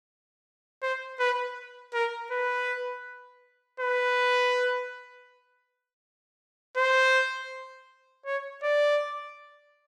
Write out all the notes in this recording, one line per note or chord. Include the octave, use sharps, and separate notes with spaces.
C5
B4
A#4
B4
B4
C5
C#5
D5